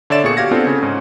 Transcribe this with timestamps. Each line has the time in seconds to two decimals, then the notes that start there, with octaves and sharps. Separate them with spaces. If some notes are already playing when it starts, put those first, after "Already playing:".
0.10 D3 C#5 D5 E5 A6 E7
0.24 A#2 B3 G#4 C#6 C#7
0.37 F#4 G4 F5 G#6 A#6
0.51 B3 C4 D4 F4 A4
0.67 C#3
0.81 G#2 C#4